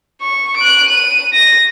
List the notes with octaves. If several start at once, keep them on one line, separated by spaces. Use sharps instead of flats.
C#6
F#6 D7
D#7
A#6